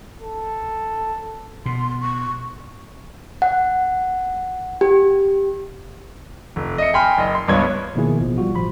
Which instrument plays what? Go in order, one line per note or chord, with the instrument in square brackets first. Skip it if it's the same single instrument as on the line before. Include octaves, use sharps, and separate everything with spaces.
[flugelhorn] A4
[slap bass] B2 [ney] C6
[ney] C#6
[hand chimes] F#5
G4
[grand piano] F1
D#5 E5 C#7
G5 G#5 B5 C6 F6
F#1 D#5
C6
C#2 G2 B3 C#5 G#6
[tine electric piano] B2 D#3 F3 A#3 E4 G#4
A1 B2 F3
G3 F4 F#4
A1 F3 B5 C6